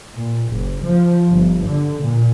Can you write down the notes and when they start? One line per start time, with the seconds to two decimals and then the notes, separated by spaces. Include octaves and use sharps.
0.14 A#2
0.48 F#1
0.83 F3
1.28 G1
1.65 D3
2.02 A#2